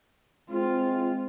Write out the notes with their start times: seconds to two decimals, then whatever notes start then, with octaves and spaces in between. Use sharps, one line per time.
0.51 G#3 C4 F4